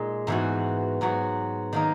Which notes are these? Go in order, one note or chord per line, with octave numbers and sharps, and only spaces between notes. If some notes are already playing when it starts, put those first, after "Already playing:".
Already playing: A#2 G#3 D#4
G#2 E3 B3 F#4
G#2 F#3 B3 F#4
D#3 A#3 D#4